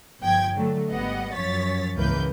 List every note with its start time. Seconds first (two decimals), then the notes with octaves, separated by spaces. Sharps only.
0.21 G1 F3 G5 G#6
0.54 D3 F#3 A3
0.90 G#1 G3 B3 D#5 F#5
1.35 F#2 F3 C#5 A6 B6
1.96 C#2 G#2 E3 A#3 B4 G6